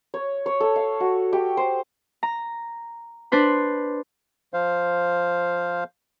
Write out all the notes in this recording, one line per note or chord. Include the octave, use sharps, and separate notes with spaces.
C#5
C#5
A4
F5
F#4
G4
C5
A#5
D4 B4 C5 B5
F3 C5 F5